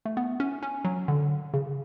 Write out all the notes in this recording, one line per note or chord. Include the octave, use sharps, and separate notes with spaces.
A3
B3
C#4
C#4
F#3
D3
C#3